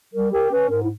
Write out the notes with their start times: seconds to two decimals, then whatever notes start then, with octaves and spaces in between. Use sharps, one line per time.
0.14 G3 A#4
0.32 G4 A#4
0.52 C#4 B4
0.70 G#2 A#4
0.83 E4